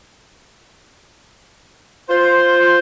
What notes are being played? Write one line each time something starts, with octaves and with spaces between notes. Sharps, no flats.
F4 C5